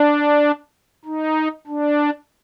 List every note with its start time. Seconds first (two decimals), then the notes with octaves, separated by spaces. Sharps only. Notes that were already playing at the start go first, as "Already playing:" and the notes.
Already playing: D4
1.05 D#4
1.67 D4